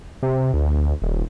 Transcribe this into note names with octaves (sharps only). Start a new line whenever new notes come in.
C3
D2
D#1